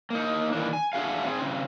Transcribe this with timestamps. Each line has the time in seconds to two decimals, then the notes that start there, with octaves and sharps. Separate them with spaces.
0.10 A#3 D#4
0.53 D#3 E3 A#3 D4
0.73 G#5
0.93 A3 D4 F#4 G#4 F5
1.26 C4 G#4
1.40 C#3 C4